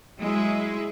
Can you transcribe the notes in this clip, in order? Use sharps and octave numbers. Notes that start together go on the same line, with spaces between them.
F#3 G#3 E4 G#4